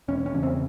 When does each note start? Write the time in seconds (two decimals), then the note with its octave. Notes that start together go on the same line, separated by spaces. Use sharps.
0.08 E1 C#4
0.26 C#4
0.34 E2 C#3
0.43 C4